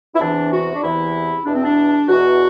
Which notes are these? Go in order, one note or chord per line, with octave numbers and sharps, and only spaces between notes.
E4
E2 C3 E3 D4
F#4
D4
E2 C3 E3 E4
E2 B2 D4
C4
D4
E2 B2 F#4